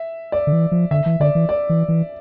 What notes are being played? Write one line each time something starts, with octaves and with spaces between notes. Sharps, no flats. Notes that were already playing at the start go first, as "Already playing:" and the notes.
Already playing: E5
D5
D3
E3
F3
D3 E5
E3
D3 D5
E3
D5
E3
E3